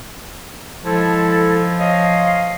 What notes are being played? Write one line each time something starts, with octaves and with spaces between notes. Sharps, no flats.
F3 G#3 E4 A4
C#5 D#5 F5